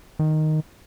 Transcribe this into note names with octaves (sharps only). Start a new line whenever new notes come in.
D#3